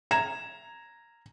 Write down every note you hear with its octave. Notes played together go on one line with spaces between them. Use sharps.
A#5 G#6 E7